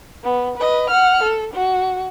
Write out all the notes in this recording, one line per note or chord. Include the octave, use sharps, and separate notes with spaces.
B3
B4 D#5
F#5 F6
A4
F#4